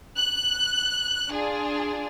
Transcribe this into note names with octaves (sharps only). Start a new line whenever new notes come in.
F#6
D4 F4 G#4